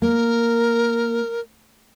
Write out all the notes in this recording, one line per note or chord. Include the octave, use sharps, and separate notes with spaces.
A#3 A#4